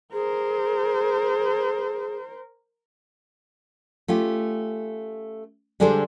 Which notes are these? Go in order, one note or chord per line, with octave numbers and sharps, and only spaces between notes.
G#4 A#4 C5
A3 C#4 F4 G4
D3 G3 G#3 G#4 A4 C5